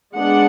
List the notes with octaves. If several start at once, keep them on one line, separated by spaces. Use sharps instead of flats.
G#3 B3 D4 F#5